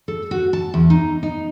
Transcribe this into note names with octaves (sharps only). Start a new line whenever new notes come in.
A4
F#4
A5
E2
D#4
D#4